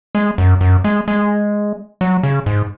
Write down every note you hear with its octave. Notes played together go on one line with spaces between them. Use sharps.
G#3
F#2
F#2
G#3
G#3
F#3
C#3
G#2